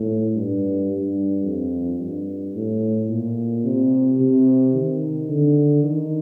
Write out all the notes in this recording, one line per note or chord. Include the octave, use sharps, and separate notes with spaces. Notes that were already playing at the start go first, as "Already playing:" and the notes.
Already playing: A2
G2
G2
F2
G2
A2
A#2
C3
C3
D#3
D3
D#3